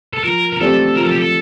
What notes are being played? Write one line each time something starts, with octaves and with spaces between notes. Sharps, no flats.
A4
F3 A#4
A#4
A3 C4 G4 A4 D5
F3 A#4
A4
G4
A4